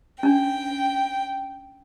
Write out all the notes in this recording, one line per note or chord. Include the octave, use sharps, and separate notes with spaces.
C#4 D4 G5